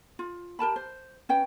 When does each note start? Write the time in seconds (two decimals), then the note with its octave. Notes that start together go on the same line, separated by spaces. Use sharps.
0.19 F4
0.59 G4 A#4 A5 B5
0.76 C5
1.29 C#4 B4 G5